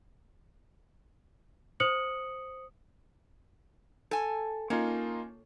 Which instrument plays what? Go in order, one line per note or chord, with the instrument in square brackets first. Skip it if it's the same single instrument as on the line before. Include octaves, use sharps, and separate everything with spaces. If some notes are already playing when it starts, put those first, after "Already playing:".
[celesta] C5 D#6 C#7 F#7
[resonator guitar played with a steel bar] A4 G#5
[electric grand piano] A#3 D#4 F4 [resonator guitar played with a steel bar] C#4